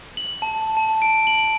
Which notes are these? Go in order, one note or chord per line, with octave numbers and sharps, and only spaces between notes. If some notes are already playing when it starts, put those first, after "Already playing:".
F#7
A5
A5
D7
F#7